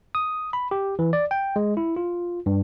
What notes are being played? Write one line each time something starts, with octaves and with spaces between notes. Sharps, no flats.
D#6
B5
G4
E3
D5
G5
G#3
E4
F4
G2